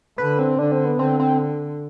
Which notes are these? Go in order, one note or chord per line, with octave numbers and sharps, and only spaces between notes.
D3 B4
C4
D3 D4
C4
B3
D3 C4
C4